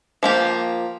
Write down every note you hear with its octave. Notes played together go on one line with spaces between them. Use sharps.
F3 A#3 G4